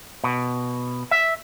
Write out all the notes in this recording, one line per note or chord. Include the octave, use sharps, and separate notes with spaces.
B2
E5